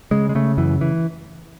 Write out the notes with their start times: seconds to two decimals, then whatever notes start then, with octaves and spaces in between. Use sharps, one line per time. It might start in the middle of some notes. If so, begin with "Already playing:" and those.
0.11 C#3 G#3
0.29 G#3
0.35 C#3 A3
0.58 F#2 E3
0.81 E3